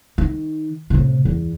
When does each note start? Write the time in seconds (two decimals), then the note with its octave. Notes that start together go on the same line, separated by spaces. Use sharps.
0.18 D#3
0.90 A2 C3
1.25 E2